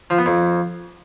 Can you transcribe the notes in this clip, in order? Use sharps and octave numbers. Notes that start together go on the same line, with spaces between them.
F3
B3
F2